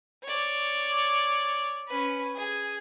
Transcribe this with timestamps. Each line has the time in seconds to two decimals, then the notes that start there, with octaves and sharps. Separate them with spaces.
0.24 C#5 D5
1.88 C#4 B4
2.35 G#4